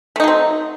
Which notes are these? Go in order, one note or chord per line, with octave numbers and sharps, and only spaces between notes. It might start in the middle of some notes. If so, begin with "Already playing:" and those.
F#3 A3 C4 D#4